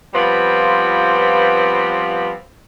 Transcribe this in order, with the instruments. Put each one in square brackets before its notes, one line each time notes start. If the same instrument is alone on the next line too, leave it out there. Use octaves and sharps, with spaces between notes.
[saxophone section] F3 G3 B3 C4 F4 B4